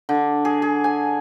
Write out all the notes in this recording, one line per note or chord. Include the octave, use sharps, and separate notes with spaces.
D3
G#4
G#4
G#5